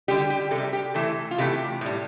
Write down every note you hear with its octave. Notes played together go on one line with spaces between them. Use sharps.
D3 G3 G4
G4
C3 G3 A4
G4
C3 E3 A3 A4
F4
C3 E3 A3 G4
A2 G3